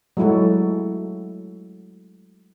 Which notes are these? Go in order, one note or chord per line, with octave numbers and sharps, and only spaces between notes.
F#3 G#3 A3 E4 F#4 A4